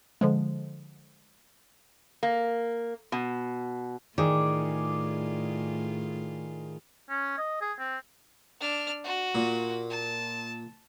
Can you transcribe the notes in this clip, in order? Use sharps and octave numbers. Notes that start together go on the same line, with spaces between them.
D3 F3 G#3
A#3
B2
A2 D#3 F4 G#4 D5
C#4
D#5
G#4
C4
D4 F6
F#4
A#2
A5